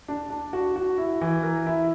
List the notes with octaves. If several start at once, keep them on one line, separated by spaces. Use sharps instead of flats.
D4
D4
F#4
F#4
E4
E3
A#4
E4